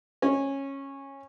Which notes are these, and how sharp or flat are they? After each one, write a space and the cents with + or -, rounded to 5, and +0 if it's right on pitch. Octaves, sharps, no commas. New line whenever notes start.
C#4 -15